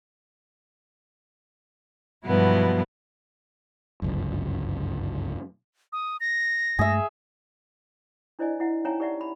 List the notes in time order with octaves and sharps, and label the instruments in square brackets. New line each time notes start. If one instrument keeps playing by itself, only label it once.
[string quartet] G2 B2 F3 F#3 B3 E4
[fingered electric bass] G1 C#2 F#2
[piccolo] D#6
A#6
[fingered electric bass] G2 G#3 A3 [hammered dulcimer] G#4 E5
[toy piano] D4 E4 C5 D5 D#5 G#5
E4 E5 F#5
C#4 D#4 C#5 E5 G#5 A#5
G4 B4 D5 E5 F#5
B5